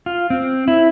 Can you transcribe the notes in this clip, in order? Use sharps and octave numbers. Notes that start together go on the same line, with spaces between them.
F4
C4
E4